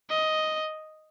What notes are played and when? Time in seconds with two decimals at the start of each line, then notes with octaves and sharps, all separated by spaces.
0.10 D#5